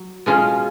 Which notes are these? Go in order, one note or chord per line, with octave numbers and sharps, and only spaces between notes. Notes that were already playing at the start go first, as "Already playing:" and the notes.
Already playing: F#3
B2 G#3 C#4 F4